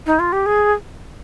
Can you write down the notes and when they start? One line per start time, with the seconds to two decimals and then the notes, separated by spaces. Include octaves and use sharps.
0.06 D#4
0.19 F4
0.32 G4
0.46 G#4